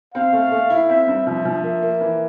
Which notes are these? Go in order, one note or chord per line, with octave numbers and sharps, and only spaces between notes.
C4 F5
A3
A3
E4
C4 E5
G2
F3 E5
F3
A#3 E5
A#3
E3